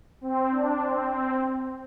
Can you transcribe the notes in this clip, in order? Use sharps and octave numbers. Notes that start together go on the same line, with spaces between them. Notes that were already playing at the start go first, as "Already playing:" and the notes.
C4
D4
C4
C4